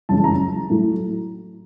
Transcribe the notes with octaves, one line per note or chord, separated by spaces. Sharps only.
F#2 C#3 E3 G#3 C#4 A5
A#5
A2 F#3 A3